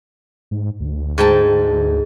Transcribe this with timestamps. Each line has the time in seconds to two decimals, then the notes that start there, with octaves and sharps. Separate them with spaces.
0.51 G#2
0.80 D2
1.18 G#2 G5 A5